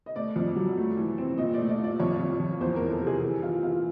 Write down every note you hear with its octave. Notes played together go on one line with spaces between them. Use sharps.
D#5
A3 D5
F2
F#3
A3
E3
C4
A#2 D#5
D5
A3
D5
A#2 D5
F2 C#5
F2
F2
E2 C5
A#4
E2
A4
C3
G#4
E3
E3 F4
E3 F4